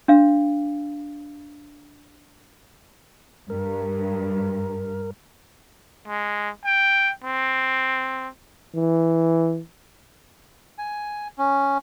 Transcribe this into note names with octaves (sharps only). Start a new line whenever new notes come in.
D4 F5
G2 A#4
G#3
G5
C4
E3
G#5
C#4